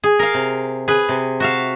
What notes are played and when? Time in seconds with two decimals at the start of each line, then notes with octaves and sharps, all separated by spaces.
0.04 G#4
0.19 A#4 F5
0.34 C3
0.88 G#4 B4
1.09 C3
1.40 F#4 E5 F5